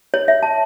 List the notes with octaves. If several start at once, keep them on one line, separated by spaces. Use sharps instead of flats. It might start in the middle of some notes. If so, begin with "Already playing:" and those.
C#5
E5
A5